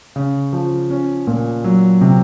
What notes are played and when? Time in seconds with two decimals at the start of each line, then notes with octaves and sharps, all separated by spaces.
0.16 C#3
0.53 F3
0.90 C#4
1.27 A#2
1.64 F#3
2.01 C3